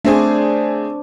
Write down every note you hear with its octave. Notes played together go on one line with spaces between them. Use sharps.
A3 C4 D4 G#4 C5 D5